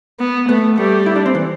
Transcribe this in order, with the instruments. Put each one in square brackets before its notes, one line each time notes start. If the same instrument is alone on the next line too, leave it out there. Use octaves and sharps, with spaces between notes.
[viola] B3
[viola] A3 [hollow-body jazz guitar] B3
[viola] G3 [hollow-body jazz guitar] A3
[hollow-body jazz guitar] E4
D4
C4
E3